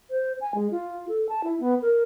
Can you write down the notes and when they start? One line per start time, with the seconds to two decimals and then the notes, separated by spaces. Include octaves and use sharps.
0.10 C5
0.41 G#5
0.54 G#3
0.71 F4
1.09 A4
1.29 A5
1.44 E4
1.60 B3
1.82 A#4